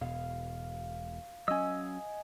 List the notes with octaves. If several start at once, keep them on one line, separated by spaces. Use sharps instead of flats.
E1 B2 F5
F#3 C#4 D#5 G#5 E6